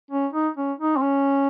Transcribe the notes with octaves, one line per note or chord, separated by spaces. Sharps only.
C#4
D#4
C#4
D#4
C4
C#4